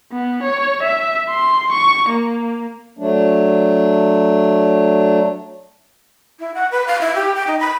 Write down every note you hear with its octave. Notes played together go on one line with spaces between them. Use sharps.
B3
C#5
E5
C6
C#6
A#3
F#3 A3 D4
E4
F#5
B4
F5
E4
G4
G5
D#4
B5